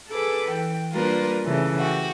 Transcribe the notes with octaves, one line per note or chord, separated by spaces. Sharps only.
G#4 A4 B4 D6
E3 G5
G3 A#3 D4 F4 A#4 B4
C#3 E3 A3
F#4 G4